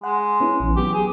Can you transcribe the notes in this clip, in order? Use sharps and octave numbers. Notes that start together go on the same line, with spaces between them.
G#3 F#5
B3 C#4 E4
A#1 E3
F#3 B3 G4
G#4